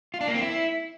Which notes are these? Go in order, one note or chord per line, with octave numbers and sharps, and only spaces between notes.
F4
D4
A#3
C4
E4